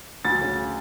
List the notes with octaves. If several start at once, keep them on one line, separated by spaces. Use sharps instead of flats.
D2 A6
C#3